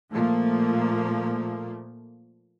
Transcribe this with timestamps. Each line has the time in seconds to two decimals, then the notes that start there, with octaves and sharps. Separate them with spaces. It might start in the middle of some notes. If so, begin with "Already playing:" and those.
0.11 A#2 F3 A3 A#3